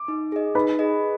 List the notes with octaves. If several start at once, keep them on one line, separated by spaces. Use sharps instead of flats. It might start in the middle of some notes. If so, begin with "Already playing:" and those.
Already playing: D6
D#4
G#4 D#5
D#4 B4 B5
G#4 D#5